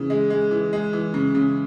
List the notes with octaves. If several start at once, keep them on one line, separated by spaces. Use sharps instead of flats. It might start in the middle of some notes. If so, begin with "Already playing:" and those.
Already playing: C#3 E3
G#3
G#3
E3
G#3
E3
C#3
C#3